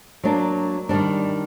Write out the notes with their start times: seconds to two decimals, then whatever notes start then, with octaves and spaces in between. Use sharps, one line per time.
0.24 F#3 A#3 D4
0.89 D#3 G3 D4